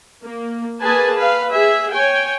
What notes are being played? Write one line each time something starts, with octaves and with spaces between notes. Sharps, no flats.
A#3
A#3 G#4 B4 G#5 A5
B4 F5
G#4 E5
C#5 G5 G#5